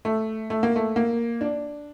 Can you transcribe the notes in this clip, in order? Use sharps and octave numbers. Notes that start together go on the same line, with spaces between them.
A3
A3
A#3
A3
A#3
D4